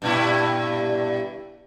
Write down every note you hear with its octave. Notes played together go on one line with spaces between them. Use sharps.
G2 A#2 E4